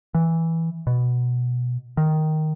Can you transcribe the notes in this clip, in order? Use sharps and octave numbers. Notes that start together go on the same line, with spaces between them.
E3
B2
D#3